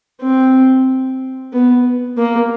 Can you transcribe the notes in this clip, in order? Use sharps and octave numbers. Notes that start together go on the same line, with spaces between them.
C4
B3
A#3